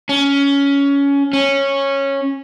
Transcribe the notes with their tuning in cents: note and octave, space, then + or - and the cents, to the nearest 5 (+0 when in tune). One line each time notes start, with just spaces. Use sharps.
C#4 +15
C#4 -10